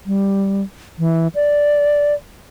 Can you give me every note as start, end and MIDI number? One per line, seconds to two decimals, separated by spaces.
0.06 0.62 55
0.99 1.28 52
1.35 2.14 74